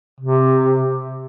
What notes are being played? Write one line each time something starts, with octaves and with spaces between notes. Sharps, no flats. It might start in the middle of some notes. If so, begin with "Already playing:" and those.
C3